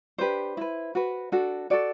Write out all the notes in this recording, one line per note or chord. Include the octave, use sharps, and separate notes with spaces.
D4 G4 B4 C5
E4 B4
F#4 B4
D4 F#4 A4
F#4 A4 D5